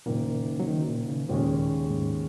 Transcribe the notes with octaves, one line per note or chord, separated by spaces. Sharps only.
F#1 F#2 A#2 D#3 A#3
F#3
D#3
A#2
C#3
D#2 A#2 C#3 G#3 C#4
G#2